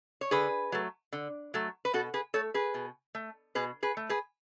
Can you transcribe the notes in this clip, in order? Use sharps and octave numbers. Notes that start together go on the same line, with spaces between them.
C#5
D3 G#4 B4
F#3 A3
D3
F#3 A3
B4
B2 F#4 A4
G#4 B4
A3 A4 C#5
G#4 B4
B2
A3
B2 G#4 B4
G#4 B4
A3
G#4 B4